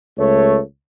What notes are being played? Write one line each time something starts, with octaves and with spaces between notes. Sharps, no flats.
C#2 A3 C#5